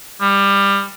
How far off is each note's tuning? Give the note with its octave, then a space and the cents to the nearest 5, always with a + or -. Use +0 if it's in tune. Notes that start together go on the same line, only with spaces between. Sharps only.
G3 +20